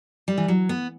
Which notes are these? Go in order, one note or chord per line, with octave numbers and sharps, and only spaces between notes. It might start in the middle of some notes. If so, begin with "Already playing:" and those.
G3
E3
F#3
B3